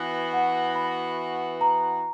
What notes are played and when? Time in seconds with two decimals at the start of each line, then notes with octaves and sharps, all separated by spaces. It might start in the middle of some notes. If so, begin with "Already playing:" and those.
Already playing: E3 B3 F#4
0.33 F#5
0.76 B5
1.61 A#5